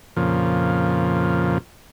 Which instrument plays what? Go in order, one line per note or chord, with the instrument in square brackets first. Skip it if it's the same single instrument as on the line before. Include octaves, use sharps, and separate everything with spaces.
[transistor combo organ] F2 A#2 C#3 F3